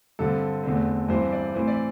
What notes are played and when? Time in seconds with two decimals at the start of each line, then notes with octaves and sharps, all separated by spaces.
0.19 G2 D3 C4 A4
0.64 E2 D3 A3 C4
1.09 G2 E3 C4 C5
1.32 D5
1.55 A2 E3 C4 C5
1.68 D5